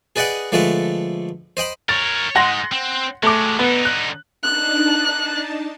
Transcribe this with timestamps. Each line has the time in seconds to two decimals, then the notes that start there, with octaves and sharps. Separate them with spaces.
0.16 G#4 B4 D5 D#5 F#5 G5
0.52 D3 F3 G#3 A3 A4 B4
1.57 C5 D#5 G5 B5
1.89 A#4 C#5 A6
2.36 G#2 G#3 F#5 C6 A#6
2.72 C4
3.23 F#3 G#3 A3 D6
3.59 D3 B3 D#4
3.85 F#6
4.43 D4 D#4 A5 F#6